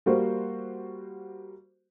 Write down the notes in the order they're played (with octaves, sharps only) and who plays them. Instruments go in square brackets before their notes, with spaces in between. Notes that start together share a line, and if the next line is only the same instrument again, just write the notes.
[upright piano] G3 A#3 F#4 C5